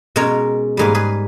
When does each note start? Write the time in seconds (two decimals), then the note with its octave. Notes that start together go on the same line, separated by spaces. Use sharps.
0.16 B2 G#3 C#4 A#4 C#5
0.77 G#2 G3 A#3 G#4 B4
0.95 G#4 B4